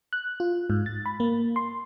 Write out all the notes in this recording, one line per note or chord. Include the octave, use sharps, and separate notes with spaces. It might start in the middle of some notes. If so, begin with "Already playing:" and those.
F#6
F4
G#2
A6
B5
A#3
C6